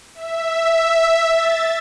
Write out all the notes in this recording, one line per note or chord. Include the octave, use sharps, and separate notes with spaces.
E5
A6